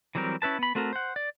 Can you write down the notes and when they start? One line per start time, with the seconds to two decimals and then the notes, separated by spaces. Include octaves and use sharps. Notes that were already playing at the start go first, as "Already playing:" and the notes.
0.15 E3 F#3 G3 C4 A#4
0.42 C#4 E4 B4 A5
0.59 B3 B5
0.75 A3 C4 F#4 A4 A#4
0.93 C5 F#5
1.16 D5